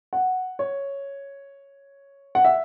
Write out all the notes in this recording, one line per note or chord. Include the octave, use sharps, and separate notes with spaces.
F#5
C#5
F#5
E5